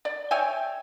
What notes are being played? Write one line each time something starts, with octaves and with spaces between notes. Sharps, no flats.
D5
C#5 E5 G5 G#5